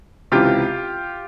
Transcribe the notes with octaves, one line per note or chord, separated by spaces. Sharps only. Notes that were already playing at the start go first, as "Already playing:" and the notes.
C#2 C3 E3 F4 G4